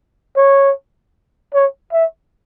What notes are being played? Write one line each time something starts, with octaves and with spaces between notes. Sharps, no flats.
C#5
C#5
E5